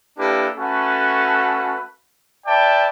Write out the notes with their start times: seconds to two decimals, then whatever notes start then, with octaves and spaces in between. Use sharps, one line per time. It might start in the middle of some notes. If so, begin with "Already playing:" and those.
0.18 A#3 D4 E4 G4 A4 B4
0.58 A3 C#4 F#4 A4 B4 F#5
2.46 B4 D5 E5 G5 A5